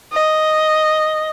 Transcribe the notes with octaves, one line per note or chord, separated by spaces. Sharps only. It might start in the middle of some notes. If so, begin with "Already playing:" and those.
D#5